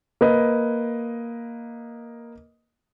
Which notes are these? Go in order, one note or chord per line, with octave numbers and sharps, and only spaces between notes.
A#3 B4 D#5